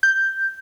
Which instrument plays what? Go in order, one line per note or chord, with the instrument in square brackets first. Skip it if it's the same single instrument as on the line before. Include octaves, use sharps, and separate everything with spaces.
[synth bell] G6